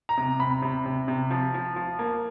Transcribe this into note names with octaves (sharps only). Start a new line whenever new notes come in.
A#5
C3
C3 B5
C3
C3
C3
F3
F3
F3
A#3